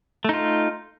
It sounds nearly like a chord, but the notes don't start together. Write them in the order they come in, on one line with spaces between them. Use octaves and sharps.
A3 D#4 F4